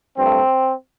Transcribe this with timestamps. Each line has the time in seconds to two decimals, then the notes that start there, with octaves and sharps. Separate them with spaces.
0.18 G2 F3 A3 C4